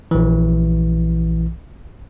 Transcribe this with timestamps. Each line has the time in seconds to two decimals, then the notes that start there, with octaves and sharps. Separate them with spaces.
0.11 A#1 E3